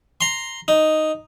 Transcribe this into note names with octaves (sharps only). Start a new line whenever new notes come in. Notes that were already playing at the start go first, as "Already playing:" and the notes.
A#5 C6
D#4